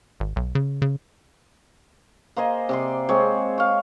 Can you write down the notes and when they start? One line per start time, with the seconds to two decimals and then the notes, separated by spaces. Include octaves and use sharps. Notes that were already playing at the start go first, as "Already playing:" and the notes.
0.20 G#1
0.36 B1
0.55 C#3
0.82 C#3
2.36 A#3 C5 D#5 G#5
2.69 C3 D5 C6
3.09 G#3 C4 C5 C#5
3.58 C#5 F5